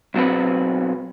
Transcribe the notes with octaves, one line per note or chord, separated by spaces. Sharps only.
B1 F#3 C4 B4